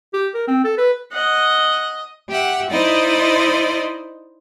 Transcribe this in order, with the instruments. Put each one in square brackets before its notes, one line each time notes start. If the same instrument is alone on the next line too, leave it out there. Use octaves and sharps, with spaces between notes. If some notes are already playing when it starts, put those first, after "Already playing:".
[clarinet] G4
A#4
C4
A4
B4
[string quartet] D#5 [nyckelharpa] F#5
[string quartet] G4 E5 F#5
D#4 E4 C5 D5 D#5